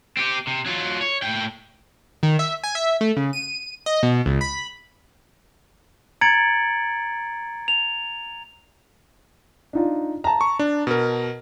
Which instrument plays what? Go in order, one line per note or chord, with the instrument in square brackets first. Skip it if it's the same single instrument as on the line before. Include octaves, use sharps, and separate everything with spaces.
[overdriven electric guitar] C4 G4
C3
F#3 F4
C#5
A2 G5
[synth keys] D#3
E5
G#5
E5
A3
C#3
D#7
D#5
B2
C#2
B5
[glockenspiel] A#5 G#6 A6 C#7 D7 F#7
F7
[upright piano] D4 D#4 F4
A5 A#5
[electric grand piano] C#6
D4
B2 A#4